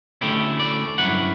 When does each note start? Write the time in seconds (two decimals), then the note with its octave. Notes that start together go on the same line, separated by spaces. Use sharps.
0.21 D2 D3 A3 C#4 E4 G4
0.60 D5
0.98 G2 D3 F#3 C#4 E4 F#5